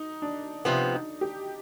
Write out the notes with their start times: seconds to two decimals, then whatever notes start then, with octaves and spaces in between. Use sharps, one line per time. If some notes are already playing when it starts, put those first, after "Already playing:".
Already playing: D#4
0.22 D4
0.65 C3 F3 B3
0.93 D#4
1.21 G4